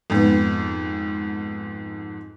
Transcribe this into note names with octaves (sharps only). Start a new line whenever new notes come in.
F2 G#2 B3